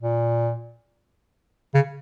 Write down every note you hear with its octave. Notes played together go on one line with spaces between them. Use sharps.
A#2
C#3